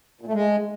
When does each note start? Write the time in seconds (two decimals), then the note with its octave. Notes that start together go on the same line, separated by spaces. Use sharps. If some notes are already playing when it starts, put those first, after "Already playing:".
0.21 A#2
0.27 A3
0.33 G#3